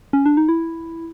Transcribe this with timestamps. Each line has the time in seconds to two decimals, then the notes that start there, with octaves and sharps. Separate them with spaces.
0.13 C#4
0.26 D4
0.37 D#4
0.49 E4